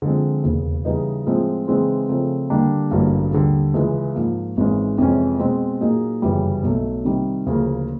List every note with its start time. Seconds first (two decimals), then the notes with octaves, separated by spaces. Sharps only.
0.02 D3 F3 G#3 C4
0.43 E1 D#2 C#3
0.85 C#3 E3 G3 B3 D#4
1.26 A2 F3 G#3 C4 F4
1.68 C#3 E3 G#3 C4 D#4
2.09 C#3 F3 A3 C4
2.50 D3 G3 A#3 D4 G4
2.91 A1 G2 D3 F#3 A#3
3.32 D#2 D3 G3
3.74 C#2 C#3 E3 G#3
4.15 G#2 F3 A#3
4.57 G#1 G#2 E3 G#3 C#4
4.98 F2 C3 E3 G#3 C#4
5.39 B2 G#3 C4
5.81 A#2 F#3 A#3 D#4 G#4
6.22 G1 F#2 C#3 E3 G3
6.63 B1 B2 F#3 A3
7.04 C3 D#3 G3
7.46 D2 C#3 F3 A#3